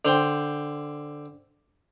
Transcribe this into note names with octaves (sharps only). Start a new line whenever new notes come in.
D3 C5 G5